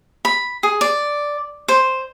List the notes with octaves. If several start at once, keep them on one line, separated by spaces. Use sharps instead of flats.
B5
G#4
D5
C5